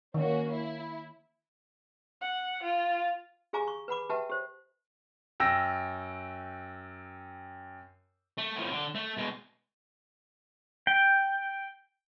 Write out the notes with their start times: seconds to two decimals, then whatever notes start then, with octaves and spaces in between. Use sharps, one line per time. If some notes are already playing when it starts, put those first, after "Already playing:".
0.14 D#3 A#3 C#4 F#4
0.52 E4
2.21 F#5
2.63 F4
3.53 G4 G#4 F5 G#5 A#5 D6
3.67 C#6
3.88 B4 F#5 B5 D6
4.10 G4 B4 E5 F#5 G5 A5
4.29 G4 C5
5.40 F#2 G5 E6 A#6
8.38 A3
8.56 A2 F3
8.71 D3
8.95 A3
9.17 B2 G#3
10.87 G5